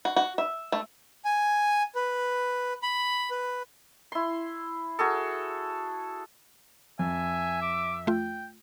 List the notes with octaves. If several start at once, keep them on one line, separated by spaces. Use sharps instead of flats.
F#4
F#4
E5
A3
G#5
B4
B5
B4
E4 C6
F#4 G#4 A4
F2 E5 G#5
D6
A3 F4 G5